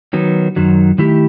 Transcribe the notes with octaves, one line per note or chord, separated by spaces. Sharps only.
D#3 F#3 B3
F#2 D#3 F#3
D#3 A3 E4 G4